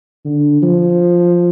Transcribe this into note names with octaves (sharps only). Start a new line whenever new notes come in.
D3
F3